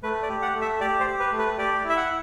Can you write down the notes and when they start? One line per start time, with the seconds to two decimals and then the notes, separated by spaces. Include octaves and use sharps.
0.03 A3 B4
0.23 D5
0.29 G4
0.42 F#5
0.55 A3
0.61 E5
0.81 G4 D5
1.00 C5
1.06 G4
1.19 B4
1.32 A3
1.39 B4
1.58 G4 D5
1.84 E4
1.90 E5
1.97 F#5